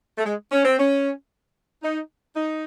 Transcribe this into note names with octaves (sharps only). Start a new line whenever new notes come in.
A3
G#3
C#4
C4
C#4
D#4
D#4